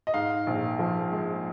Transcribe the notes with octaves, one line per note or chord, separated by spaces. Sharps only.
D#5
G#2 F5
A#1
F3
G#3